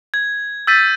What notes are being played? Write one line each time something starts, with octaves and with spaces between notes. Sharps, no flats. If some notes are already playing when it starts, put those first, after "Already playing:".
G#6
E6 G6 A6 B6 D#7